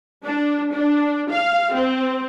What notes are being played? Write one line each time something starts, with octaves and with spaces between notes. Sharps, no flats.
D4
D4
F5
C4